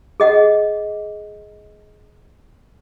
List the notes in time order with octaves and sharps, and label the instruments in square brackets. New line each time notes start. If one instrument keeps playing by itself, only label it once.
[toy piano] G#4 D#5 F#5